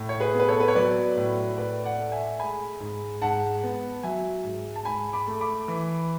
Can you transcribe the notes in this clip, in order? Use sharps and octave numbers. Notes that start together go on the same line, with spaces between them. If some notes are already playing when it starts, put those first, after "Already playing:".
Already playing: A2
C#5
G#4 B4
B3
B4
A4 C#5
B4
C#5
F#3 B4 D5
A2
A2 B4 D5
D5 F#5
A3
E5 G#5
G#3 G#5 B5
G#2
G#2 F#5 A5
B3
F#3 E5 G#5
G#2
A5
G#2 G#5 B5
B5 D6
A3
B5 D6
E3